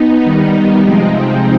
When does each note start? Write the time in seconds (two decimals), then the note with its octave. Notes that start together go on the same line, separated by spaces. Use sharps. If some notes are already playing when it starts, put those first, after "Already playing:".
Already playing: B3 D#4
0.24 D#3 G3 B3 D#4
0.83 C3 F3 G#3 C4 D#4